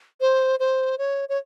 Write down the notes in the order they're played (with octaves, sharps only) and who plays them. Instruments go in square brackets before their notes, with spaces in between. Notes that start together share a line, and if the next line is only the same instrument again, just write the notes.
[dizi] C5
C5
C#5
C#5